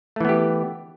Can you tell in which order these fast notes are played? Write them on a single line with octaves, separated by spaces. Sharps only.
A3 E3 B3 G4